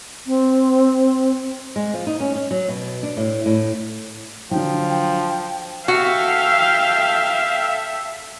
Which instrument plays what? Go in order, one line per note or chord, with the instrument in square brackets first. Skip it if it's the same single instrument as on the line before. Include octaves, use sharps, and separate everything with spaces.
[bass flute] C4
[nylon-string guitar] G#3
F3
D#4
C#4
C#4
F#3
B2
D4
A2
A2
[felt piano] D3 F#3 [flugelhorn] F3 [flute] G5
[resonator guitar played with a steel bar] F#4 [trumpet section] A4 E5 [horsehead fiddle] F5 G5